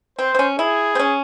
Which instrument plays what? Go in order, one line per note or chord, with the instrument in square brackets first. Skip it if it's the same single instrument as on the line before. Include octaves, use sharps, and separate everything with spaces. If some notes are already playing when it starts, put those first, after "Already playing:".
[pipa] C4 [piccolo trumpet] C5
[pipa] C4
C#4
[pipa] E4 [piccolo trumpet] G#4
[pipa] C4
C#4